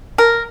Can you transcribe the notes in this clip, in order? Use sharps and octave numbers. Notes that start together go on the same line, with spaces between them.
A#4